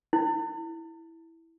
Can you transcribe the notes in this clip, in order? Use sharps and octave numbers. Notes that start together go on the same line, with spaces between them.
E4